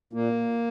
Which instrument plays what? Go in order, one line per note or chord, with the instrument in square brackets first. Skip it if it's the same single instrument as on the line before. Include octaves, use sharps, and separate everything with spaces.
[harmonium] A#2 A#3